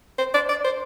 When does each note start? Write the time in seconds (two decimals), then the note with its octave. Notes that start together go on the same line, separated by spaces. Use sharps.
0.18 C5
0.34 D5
0.49 D5
0.64 C5